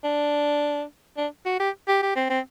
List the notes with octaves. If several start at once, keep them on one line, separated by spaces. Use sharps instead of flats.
D4
D4
F#4
G4
G4
G4
C4
C4